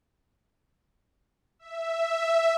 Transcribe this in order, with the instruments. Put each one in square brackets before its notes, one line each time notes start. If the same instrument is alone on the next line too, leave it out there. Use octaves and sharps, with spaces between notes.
[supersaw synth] E5